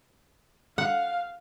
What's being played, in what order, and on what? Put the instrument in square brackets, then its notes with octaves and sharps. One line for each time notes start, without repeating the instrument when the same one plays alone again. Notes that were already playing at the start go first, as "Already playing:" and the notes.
[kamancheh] F5 [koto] F#5